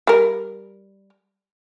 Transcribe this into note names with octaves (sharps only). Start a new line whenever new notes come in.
G3 A#4